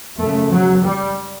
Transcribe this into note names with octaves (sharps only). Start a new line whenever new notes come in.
F#2 C#3 A3
F#3
G3